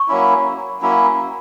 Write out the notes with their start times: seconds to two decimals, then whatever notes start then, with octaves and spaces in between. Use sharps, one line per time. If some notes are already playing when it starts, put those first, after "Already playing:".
Already playing: C#6
0.08 F#3 A#3 C#4 E4
0.81 F#3 A#3 C#4 E4